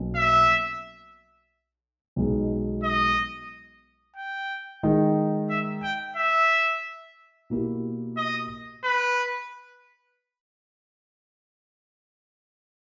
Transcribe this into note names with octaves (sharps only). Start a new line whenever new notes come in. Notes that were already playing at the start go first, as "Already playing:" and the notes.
Already playing: B1 B2 A#3 C#4
E5
B1 B2 G#3 D#4
D#5
G5
D#3 G#3 D#4
E5
G5
E5
B2 A#3 E4 G4
D#5
B4